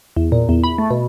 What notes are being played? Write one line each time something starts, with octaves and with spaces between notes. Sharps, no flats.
E2
A#2
E2
B5
A3
B2